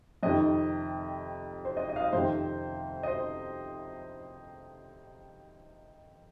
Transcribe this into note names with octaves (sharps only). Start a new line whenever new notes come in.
F2 C3 D#3 D#5
C5
D#5
D#5
F5
D#5
F2 C3 D#3 C5
D#5
C5